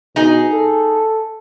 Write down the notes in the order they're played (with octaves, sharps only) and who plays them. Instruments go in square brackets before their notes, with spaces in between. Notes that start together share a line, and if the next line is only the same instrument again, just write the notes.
[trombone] B2 [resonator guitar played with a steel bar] D#4 G#4
[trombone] A4